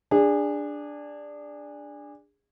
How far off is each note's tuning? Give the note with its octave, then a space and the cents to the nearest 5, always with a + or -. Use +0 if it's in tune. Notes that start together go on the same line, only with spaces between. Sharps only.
D4 +0 G#4 -25